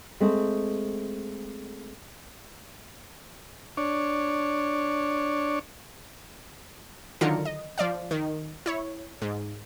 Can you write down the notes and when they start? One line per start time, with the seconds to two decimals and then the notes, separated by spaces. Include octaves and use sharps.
0.20 G#3 A3 C4
3.77 D4 C#5
7.21 D3 D#3 F#3 F4 A#4 C#7
7.45 D#5
7.78 F3 D5 F5
8.11 D#3
8.66 E4 C#5
9.22 G#2